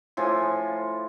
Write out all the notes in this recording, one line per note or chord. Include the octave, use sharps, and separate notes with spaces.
A2 F3 G#5